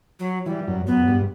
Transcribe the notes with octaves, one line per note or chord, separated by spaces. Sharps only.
F#3
E3 G3
F#2
F#2 B3
G2